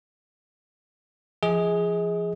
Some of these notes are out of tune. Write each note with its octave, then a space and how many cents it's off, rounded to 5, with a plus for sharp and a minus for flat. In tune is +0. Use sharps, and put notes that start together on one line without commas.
F3 -30 G#4 +0 D#5 +35